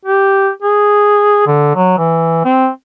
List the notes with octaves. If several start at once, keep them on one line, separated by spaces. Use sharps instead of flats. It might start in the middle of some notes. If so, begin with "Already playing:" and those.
G4
G#4
D3
F#3
E3
C4